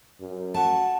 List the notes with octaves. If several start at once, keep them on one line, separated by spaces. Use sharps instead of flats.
F#2
A3 F#4 F#5 A5